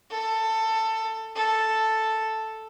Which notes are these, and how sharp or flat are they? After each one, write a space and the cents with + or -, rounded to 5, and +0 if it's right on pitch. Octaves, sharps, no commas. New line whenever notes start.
A4 +15
A4 +0